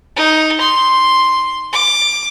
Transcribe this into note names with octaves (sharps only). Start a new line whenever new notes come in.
D#4
C6
D6